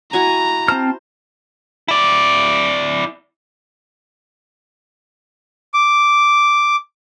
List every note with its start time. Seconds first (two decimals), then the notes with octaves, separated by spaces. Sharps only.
0.13 E4 F#4 G#5 A#5
0.68 C4 C5 A5 F6
1.88 E4 D5
5.74 D6